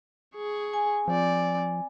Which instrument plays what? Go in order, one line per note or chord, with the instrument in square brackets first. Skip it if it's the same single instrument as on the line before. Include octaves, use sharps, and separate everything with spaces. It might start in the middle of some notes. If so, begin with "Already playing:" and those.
[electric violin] G#4 C#6
[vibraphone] G#5
[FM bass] F3 [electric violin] C4 D5